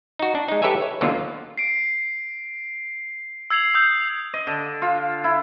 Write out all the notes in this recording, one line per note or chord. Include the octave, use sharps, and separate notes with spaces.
D#4 F#4
D4
G#3 D#4
G4 A4 B4 C#5 E5 G#5
C#5
D#2 B2 D3 F#3 A#3 F4
C7 D7
E6 G#6 C7 F7 F#7
D#6 E6 G6
D#5
D3
F4
E4